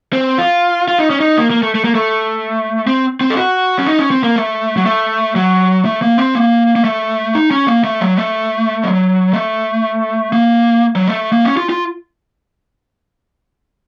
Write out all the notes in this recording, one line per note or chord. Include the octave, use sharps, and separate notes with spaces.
C4
F4
F4
D#4
C#4
D#4
A#3
A#3
A3
A3
A#3
A3
C4
C4
A4
F#4
C#4
D#4
C#4
C4
A#3
A3
F#3
A3
F#3
A3
A#3
C4
A#3
A#3
A3
D#4
C#4
A#3
A3
F#3
A3
F#3
A3
A#3
F#3
A3
A#3
C#4
F4
F4